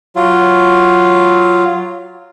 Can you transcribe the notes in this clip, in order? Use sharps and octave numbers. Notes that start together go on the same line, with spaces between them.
F#3 F4